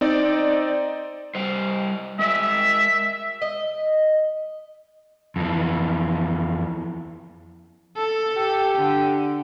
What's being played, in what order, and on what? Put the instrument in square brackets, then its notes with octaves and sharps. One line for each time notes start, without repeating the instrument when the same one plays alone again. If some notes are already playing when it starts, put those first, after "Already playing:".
[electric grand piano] C4 D#4 D5
[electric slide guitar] G3 C5 D#5
[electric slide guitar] G#3 A#4 D#5 [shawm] E5
[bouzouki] D#5
[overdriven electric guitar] F2 E3
[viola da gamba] A4
[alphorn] G4
[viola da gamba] D3